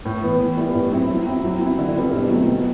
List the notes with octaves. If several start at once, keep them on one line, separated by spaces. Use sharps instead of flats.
A2
E3 B3
E3
G3 B3 E4
A2
F#3 C4 E4
F#3
C4 E4
F#3
C4 E4
D3
G3 C4 E4
B2
F#3 A3 C4
B2